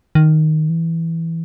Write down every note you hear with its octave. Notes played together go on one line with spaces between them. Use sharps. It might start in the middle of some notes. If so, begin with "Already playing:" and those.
D#3
E3